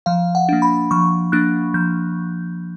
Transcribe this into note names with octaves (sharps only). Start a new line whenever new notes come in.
F3 F5
F#5
A#3 D4
B5
F3 C#6
A#3 D4 F#6
F3 G6